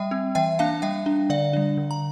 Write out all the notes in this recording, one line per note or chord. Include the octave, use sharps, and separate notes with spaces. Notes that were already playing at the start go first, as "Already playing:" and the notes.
Already playing: G3 E5 G5
C4
E3 E5 G5
A#3 D4 F5 A5
G3 E5 G5
D4
D3 D5 F5
G3 D4
D3
A#5